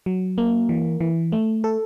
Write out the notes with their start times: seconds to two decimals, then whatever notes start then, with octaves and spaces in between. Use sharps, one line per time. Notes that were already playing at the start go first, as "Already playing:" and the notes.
0.06 F#3
0.38 A#3
0.69 E3
1.01 E3
1.32 A3
1.64 A4